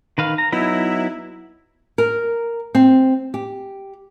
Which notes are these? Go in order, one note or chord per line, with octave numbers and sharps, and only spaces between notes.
D#3 B4 F5
A#5
F#3 B3 D#4 E4
A#4
C4
G4